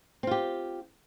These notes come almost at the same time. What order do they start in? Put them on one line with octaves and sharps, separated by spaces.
C4 F4 G4